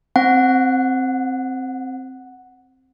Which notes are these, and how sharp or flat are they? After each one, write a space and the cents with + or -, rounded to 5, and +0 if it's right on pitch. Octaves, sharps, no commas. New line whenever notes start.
C4 +0 F#5 +0